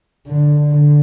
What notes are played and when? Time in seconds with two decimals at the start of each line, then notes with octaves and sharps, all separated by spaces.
0.26 D3
0.71 D3